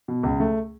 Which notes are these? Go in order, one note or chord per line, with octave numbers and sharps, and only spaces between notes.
B2
C#2
A3